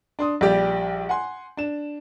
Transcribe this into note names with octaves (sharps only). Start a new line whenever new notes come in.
D4 C6 D#6
A#1 G3 G4 D5
F#5 G#5 C6
D4 E7